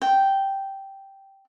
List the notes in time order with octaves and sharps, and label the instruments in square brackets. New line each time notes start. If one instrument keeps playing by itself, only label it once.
[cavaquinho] G5